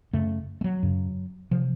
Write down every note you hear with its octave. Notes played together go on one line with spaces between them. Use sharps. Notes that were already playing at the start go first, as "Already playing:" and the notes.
F#2 C#3 A3
A3
F#3
F#2 C#3
C3 F3